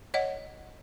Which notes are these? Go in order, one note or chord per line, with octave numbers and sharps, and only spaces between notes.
C#5 D#5 F#5